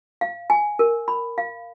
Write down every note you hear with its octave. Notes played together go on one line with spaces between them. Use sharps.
F5
G#5
A#4
B5
F5